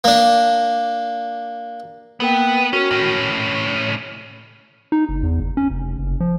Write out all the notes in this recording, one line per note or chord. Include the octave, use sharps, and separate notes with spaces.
A#3 D4
A#3 B3 A#4 G5
C#4 F#4 A#4 F6
A2 C#4 A#6
D#4
F#1
E2
F#1
C#4
F1
F#1
F3